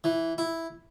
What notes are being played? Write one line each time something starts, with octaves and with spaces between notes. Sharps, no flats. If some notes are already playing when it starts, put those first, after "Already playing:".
E3
E4